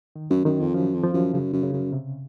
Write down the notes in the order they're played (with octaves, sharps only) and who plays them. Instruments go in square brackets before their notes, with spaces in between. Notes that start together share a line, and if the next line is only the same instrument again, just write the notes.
[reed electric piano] D#3
[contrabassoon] F#2
[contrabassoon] F#2 [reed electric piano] D#3
[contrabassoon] F2
[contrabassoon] F#2 [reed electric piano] F3
[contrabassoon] F2
[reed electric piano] F3
[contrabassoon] F#2
[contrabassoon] F#2 [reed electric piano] C#3
[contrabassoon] F#2
[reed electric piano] C#3
[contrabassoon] F#2
[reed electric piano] C3